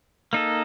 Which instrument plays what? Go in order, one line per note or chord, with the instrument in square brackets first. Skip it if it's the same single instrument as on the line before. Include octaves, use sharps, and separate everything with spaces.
[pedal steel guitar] A#3 D#4 A4